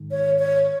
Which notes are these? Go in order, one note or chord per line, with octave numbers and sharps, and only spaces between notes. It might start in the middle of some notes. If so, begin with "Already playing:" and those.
Already playing: G#2 D#3
C#5
C#5